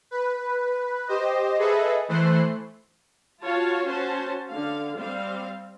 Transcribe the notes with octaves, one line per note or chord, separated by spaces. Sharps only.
B4
G4 C5 D#5
G#4 A4 B4 D#5 E5
E3 A3 C5 F#6 C7
F4 F#4 C#5 F5 A5
C#4 F#4 C5 A5
D3 F5
G3 C4 F5